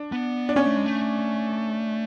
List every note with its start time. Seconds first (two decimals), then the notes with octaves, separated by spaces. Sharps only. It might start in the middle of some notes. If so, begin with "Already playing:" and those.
Already playing: D4
0.12 B3
0.49 D4
0.56 B3 C#4
0.66 A3
0.77 G#3
0.86 A3